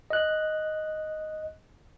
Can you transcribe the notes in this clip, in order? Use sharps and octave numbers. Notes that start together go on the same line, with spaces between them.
D#5 F#6